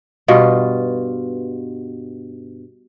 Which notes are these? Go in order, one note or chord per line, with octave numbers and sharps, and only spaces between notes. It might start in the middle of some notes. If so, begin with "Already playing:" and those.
G2 B2 F4